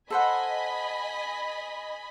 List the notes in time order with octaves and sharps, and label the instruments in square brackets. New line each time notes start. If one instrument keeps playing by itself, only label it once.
[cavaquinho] A4 C5 F#5 [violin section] D#5 G#5 B5